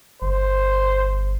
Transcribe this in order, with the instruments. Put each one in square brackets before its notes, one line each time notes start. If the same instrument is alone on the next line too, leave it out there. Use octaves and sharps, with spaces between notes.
[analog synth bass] G1 [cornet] C5